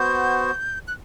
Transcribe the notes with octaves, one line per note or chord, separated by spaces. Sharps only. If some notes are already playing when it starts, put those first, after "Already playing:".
Already playing: B3 F#4 C5 G6
F#6